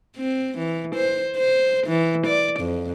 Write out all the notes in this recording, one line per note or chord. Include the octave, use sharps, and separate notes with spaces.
C4
E3
C5
C5
E3
D5
F2